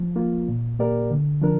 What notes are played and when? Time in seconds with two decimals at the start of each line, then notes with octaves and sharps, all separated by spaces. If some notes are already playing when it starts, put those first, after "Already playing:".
Already playing: F3
0.16 A#3 F4
0.48 A#2
0.79 A#3 G4 A#4 D5
1.11 D3
1.42 F3 D4 A#4